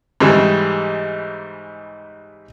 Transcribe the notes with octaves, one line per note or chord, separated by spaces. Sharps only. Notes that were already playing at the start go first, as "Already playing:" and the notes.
G#2 C#3 E3 G3